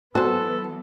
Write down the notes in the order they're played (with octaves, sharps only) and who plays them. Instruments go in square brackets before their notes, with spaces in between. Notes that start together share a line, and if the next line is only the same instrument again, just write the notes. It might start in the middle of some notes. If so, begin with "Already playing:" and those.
[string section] E3 F#3 B3 [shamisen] F#4 C5 [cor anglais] A4 [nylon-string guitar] A5